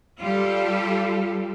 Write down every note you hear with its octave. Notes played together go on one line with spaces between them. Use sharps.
G3 F4 G4 A4